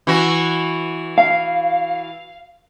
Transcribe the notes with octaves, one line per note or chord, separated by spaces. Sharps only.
E3 F#4
F5